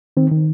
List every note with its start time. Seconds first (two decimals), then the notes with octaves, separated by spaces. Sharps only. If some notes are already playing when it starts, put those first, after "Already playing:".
0.17 D#3 C4
0.31 D#3